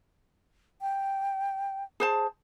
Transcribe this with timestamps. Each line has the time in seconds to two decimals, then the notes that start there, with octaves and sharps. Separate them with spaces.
0.82 G5
2.00 G#4 C5 A5